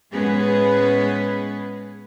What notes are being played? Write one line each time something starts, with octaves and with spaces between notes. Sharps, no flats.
A2 G#3 B3 C#4 G#4 B4